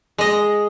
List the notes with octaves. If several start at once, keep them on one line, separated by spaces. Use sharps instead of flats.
G#3 D#5